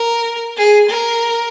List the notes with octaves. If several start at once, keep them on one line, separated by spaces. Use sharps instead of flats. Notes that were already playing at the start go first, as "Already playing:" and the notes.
Already playing: A#4
G#4
A#4